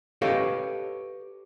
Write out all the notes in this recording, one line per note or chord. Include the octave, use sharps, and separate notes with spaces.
G4 A4 B4 C#5 D#5 F5